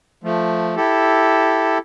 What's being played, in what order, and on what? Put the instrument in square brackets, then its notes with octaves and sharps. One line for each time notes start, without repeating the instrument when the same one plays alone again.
[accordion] F3 A3
E4 G4 A4